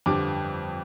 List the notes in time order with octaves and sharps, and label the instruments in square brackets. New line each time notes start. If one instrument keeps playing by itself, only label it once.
[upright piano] G1 F2 D3 G3 D6